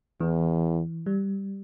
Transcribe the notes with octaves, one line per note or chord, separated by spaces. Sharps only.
E2 E3
G3